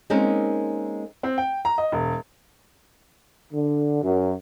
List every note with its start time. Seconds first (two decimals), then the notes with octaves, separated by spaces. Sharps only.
0.10 G#3 A#3 C4 C#4 D#4 A#4
1.23 C4
1.38 G5
1.65 A#5
1.78 D#5
1.92 E1
3.52 D3
4.02 F#2